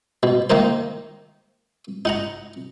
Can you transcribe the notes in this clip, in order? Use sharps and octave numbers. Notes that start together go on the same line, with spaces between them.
B2
D#3 A#3 D#4 A#4 C5
D#4 F#5 A#5